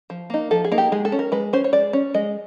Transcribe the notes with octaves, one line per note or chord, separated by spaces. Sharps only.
F3
A#3 D#4
F3 A4
G#4
A#3 D#4
G4
G#3 G#4
A4
C#4
A#4
G#3 B4
C#4 C5
C#5
G#3 D5
C#4
G#3 D#5